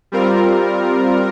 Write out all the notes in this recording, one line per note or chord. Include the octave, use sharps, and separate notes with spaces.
G3 C4 F4 A#4